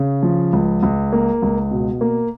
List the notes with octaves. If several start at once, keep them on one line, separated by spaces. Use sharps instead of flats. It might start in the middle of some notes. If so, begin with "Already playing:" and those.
Already playing: C#3
F3
C#2
C#2
A#3
C#2
B2
A#3